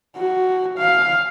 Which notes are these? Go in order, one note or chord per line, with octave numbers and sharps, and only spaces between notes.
F#4
F5